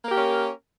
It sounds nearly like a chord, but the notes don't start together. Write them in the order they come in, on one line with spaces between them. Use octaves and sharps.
A#3 A#4 G4 C#4